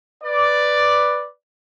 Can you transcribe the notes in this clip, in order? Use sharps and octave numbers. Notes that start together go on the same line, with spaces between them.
B4 D5